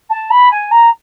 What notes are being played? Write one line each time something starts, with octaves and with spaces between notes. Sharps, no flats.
A5
B5
G#5
A#5